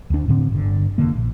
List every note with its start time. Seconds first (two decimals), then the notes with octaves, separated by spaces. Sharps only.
0.10 D2 D4
0.28 A2 D3 C4
0.52 G1 D3
0.98 F1 D3 A#3
1.15 A#1